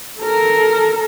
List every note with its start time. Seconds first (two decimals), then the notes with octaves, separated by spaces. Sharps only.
0.19 A4 A#4